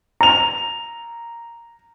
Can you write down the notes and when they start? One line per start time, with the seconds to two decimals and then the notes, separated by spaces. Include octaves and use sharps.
0.21 A#5 F7